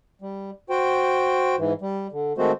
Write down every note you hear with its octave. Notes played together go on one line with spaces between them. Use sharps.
G3
F#4 C5 G5
G#2 E3
G3
D3
D#3 G#3 A3 C4 F#4 C5